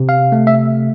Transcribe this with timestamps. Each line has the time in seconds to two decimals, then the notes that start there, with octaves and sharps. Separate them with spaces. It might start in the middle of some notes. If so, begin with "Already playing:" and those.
Already playing: C3
0.09 F5
0.32 A3
0.47 E5